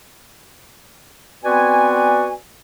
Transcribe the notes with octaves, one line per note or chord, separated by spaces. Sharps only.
B3 C4 F#4 B4 D5 G#5